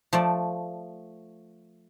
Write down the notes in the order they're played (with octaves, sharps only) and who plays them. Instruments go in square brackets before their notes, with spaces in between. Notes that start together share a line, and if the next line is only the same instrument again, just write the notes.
[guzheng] F3 A3 D5